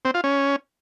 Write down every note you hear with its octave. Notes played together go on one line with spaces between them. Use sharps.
C4
F4
C#4